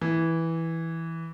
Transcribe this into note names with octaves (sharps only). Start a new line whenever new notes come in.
E3